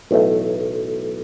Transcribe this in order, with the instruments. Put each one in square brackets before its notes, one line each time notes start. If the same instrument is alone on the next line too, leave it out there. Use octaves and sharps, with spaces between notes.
[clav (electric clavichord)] B1 A2 E3 A3